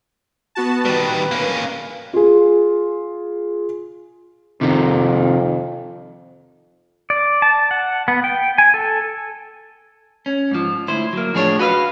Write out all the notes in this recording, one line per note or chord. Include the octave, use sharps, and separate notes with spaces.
B3 F#4 A5
D#3 G3 B4
A#3 C#4
F4 G#4
F2 C3 D#3
D5
A5
F#5
B3
G5
G#5
A4
C#4
G#2 F3
D2 E4 C5
F#3 A#3
A2 F3 D4 G#4 A#4 C#5
F#4 B4 D#5 F5